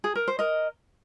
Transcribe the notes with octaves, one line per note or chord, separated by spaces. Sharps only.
G#4
A#4
C5
A#4 D#5